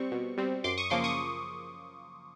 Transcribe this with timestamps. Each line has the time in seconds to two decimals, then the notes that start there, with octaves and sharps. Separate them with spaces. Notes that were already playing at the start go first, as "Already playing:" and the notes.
Already playing: G3 C4 C#6
0.12 B2
0.38 G3 C4
0.64 F#2 C6 D6
0.78 C#6 D#6
0.90 C#3 F3 A#3 C6 D6
1.04 C#6 D#6